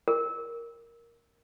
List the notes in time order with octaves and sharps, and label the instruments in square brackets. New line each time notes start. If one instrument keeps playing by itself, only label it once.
[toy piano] A#4